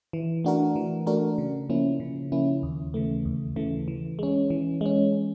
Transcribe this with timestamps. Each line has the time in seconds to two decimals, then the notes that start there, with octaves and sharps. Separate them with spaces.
0.13 E3
0.45 A3 D4 F#4 A#4
0.76 E3
1.06 A3 D4 F#4 A#4
1.38 C#3
1.70 F3 A#3 C#4 E4
2.00 C#3
2.32 F3 A#3 C#4 E4
2.63 D#2
2.94 C#3 E3 A3
3.25 D#2
3.56 C#3 E3 A3
3.88 E3
4.19 G#3 C#4
4.50 E3
4.81 G#3 C#4